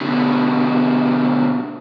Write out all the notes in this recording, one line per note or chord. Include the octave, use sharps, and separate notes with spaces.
B2 D3